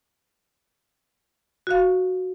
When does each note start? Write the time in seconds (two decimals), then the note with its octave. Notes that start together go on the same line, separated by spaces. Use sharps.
1.67 F#4 F5